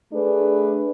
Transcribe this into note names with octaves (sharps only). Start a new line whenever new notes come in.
A3 D4 G#4 B4